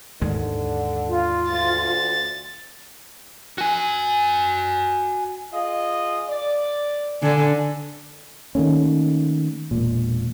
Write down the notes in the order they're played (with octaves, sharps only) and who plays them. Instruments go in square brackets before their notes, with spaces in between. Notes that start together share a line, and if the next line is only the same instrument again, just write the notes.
[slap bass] D#2 G#2 G#3 [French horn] D3
[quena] F4
[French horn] D2 [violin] A6
[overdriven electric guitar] F#4 G#5
[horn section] F4 G#4 D#5
D5
[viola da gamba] D3 [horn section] G#5
[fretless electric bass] D#3 A3 A#3 C#4
E1 A#2